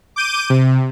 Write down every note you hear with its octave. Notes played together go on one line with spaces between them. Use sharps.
D6 G6 D#7
C3